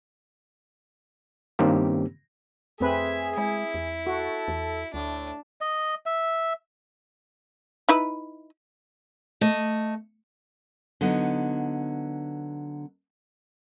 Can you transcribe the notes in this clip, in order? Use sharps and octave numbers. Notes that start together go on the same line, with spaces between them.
G2 D#3 A#3 C4 C#4 G4
F2 A3 C4 G#4 B4 E5
G#3 E4
E2
F#4 A4
E2
D2 A2 D4
D#5
E5
D#4 E4 B4
A3 D#5
D3 F#3 B3 D#4